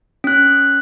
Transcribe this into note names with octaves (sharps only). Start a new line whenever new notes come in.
C#4 F#6